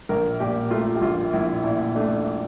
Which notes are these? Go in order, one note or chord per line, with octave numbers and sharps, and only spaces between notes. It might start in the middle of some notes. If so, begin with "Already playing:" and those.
A#1 A#4
A#2 G4
A3 F4
G4
A#1 F4
A#1 E4
A#2 E4
A3 D4